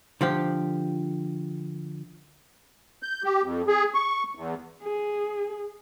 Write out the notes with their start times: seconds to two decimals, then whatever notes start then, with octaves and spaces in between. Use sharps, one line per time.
0.21 D3 F3 G4
3.03 G6
3.24 G4
3.42 F2
3.68 G#4
3.94 C#6
4.35 E2
4.82 G#4